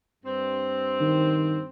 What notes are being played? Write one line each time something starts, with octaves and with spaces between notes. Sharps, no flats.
G2 C4
D#3